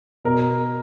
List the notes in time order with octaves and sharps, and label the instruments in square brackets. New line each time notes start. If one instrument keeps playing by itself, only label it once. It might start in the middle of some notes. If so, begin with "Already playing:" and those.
[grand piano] B2 A#4